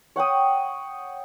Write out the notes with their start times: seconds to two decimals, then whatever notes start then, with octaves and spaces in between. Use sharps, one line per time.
0.16 C#5 F#5 G5 D#6